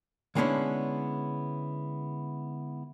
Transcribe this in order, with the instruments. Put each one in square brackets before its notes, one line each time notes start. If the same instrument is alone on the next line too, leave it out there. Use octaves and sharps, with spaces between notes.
[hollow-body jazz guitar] D3 G#3 B3 C#4 D4 E4